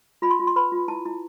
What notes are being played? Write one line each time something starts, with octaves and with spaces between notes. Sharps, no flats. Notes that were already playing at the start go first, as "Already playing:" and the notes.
F4 B5
C6
F4
C6
B4 B5
F4
E4 A5
E4